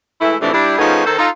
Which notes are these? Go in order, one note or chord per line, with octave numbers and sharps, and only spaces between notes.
E3 G#3 A3 E4
F2 A2 C3 E3 A3 D4
G3 D4 E4
F3 A3 B3 C#4 D#4 G#4
D#3 A4 C5
D#4 F4 A4